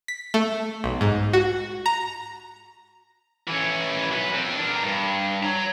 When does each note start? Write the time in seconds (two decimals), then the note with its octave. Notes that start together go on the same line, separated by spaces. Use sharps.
0.08 B6
0.34 A3
0.84 B1
1.01 G#2
1.33 F#4
1.86 A#5
3.48 E3 C#4
4.11 F#3 B4
4.34 C4 A4
4.55 D4 A#4
4.83 G2
5.43 C#5 A#5